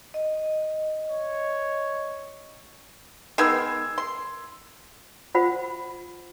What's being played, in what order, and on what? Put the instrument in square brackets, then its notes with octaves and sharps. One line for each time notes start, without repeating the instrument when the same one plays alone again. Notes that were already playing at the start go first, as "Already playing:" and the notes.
[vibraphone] D#5
[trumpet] C#5
[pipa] D#3 G#3 B3 [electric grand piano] E6 G#6 C7
[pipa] C6
[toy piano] F4 C5 F#5 B5